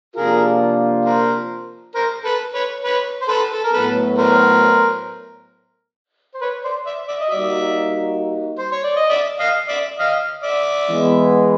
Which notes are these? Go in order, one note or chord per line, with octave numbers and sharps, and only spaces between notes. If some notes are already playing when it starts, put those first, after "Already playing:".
C3 F3 A#3 D4 F4 G#4 A#4
A#4 C5
A#4 C5
A4 B4
B4 C#5
B4 C#5
C5
A4 B4
A4
A#4
A2 F#3 B3 A4 B4
A#4 C5
C5
B4 C#5
C5 D5
D5 E5
D5 E5
D#5
G3 A#3 D#4 F#4 D5 E5
C5
C#5
D5
D#5
D5 E5
D#5 F5
D5 E5
D#5 F5
D5 E5
E3 G#3 B3